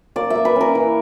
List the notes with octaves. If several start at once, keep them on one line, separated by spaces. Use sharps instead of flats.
A#3 D5
E5
A#3
B4
C#4 A#4
E3